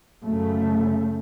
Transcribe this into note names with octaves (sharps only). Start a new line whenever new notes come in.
F#2 C#3 A3